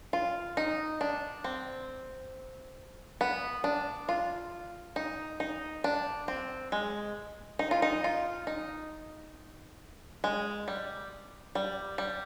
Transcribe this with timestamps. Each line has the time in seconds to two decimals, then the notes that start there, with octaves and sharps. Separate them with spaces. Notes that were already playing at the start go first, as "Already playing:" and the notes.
0.13 F4
0.57 D#4
1.01 D4
1.44 C4
3.21 B3
3.64 D4
4.09 F4
4.96 D#4
5.40 D#4
5.84 D4
6.28 C4
6.72 G#3
7.59 D#4
7.71 F4
7.82 D#4
8.04 F4
8.47 D#4
10.24 G#3
10.68 G3
11.55 G3
11.98 G3